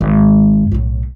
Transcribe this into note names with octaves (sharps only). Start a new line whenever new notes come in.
G#1 G#2
B1 A2